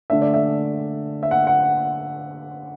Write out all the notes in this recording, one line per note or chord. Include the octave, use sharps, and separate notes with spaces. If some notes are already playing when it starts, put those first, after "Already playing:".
D3 A3 D4 E5
D5
E5
E5
F#5
F#5